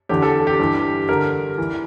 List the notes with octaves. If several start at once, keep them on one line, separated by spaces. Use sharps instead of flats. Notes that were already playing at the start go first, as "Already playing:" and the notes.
E2 D3 G4
A4
G4
G2 E3
G2 D3 A#4
E3